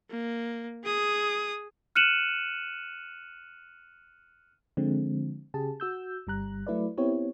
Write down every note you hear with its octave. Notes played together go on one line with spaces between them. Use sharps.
A#3
G#4 D#6
F6 F#6 C#7 D#7 E7 F#7
D3 F3 G#3 C4
C#3 G4 G#4 A5
F#4 E6 G6
G1 G3 A#5 F#6
F#3 A3 E4 B4 D5
B3 C4 E4 G4 C#5